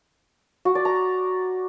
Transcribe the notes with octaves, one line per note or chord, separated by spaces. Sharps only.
F#4
D5
A#5